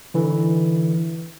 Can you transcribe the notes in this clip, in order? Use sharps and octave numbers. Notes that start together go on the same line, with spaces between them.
D3 E3